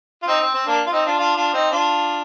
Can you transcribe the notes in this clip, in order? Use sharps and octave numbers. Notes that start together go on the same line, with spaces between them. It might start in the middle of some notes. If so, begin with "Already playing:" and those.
F4
C4 D#4
C4
C4
A#3 D4
F4
C4 D#4
D4 F4
D4 F4
D4 F4
C4 D#4
D4 F4